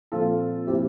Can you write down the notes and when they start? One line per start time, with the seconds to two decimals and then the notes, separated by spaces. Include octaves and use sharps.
0.12 A#2 F3 C4 F4 A4
0.67 A#2 F3 C4 E4 G4